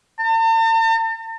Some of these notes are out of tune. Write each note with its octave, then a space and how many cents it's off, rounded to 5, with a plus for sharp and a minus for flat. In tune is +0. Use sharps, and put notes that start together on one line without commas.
A5 +45